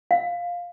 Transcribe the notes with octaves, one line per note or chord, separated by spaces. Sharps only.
F5